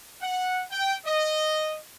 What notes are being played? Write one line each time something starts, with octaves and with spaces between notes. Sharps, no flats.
F#5
G5
D#5